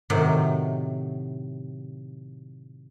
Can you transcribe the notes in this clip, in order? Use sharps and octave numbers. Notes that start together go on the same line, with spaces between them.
A2 C3 D#3 F#3